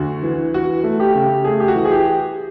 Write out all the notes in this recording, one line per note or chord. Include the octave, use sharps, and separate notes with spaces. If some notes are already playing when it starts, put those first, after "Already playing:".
Already playing: D2 F#4
E3
E3 F#4
A3
G4
C#3
A3 G#4
G4
F#4
E3
G#4
G4